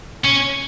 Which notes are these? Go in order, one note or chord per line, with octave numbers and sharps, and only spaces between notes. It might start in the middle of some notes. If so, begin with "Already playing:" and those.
C#4